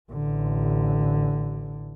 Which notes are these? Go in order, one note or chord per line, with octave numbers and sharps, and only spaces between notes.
A1 D3